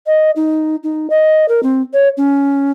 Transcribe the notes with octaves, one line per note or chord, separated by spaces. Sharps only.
D#5
D#4
D#4
D#5
A#4
C4
C#5
C#4